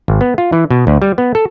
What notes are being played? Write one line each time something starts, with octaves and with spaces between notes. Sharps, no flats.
G#1
B3
F4
E3
B2
D2
G3
B3
A4